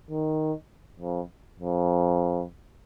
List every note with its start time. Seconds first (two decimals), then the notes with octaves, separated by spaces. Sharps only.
0.11 D#3
1.00 F2
1.59 F2